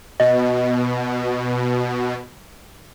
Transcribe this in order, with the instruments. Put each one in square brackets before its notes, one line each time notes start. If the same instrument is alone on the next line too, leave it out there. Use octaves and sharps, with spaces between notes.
[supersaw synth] B2 [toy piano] D#5